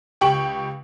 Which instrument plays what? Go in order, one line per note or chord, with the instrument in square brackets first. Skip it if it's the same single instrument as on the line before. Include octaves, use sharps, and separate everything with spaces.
[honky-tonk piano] C#2 G4 G5 C#6 F#7